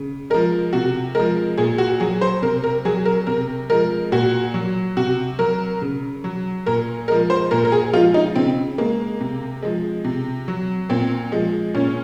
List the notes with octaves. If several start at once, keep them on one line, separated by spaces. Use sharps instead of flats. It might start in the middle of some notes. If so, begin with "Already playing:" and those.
Already playing: C#3
F3 G#3 A#4
C3 F#4
F3 G#3 A#4
A#2 G#4
F#4
F#3 G#4
C5
C3 A#4
A#4
F#3 G#4
A#4
C3 A#4
F3 G#3 A#4
A#2 F#4
F#3
C3 F#4
F#3 A#4
C#3
F#3
A#2 A#4
F3 G#3 A#4
C5
A#2 A#4
A#4
G#4
F3 G#3 F4
D#4
C#3 C4
G#3 A#3
C3
F3 G#3
C3
F#3
A#2 C4
F3 G#3
A#2 C#4